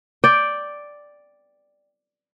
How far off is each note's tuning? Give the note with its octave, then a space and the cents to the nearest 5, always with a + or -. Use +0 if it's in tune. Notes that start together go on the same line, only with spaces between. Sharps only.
D5 +0 G5 +5